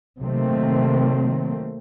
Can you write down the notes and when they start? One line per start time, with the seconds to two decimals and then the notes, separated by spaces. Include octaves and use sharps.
0.21 C3 D#3 F#3 A3 A#3 C4